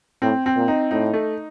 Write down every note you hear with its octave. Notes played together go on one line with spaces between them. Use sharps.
A2 C4
C4
A#2
D#4
A2 D#4
A3